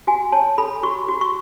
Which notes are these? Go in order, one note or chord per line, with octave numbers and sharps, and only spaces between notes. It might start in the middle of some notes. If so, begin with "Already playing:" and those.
F#4 G#5
C#5 A5
A4 B5
F#4 C#6
F#4
C#6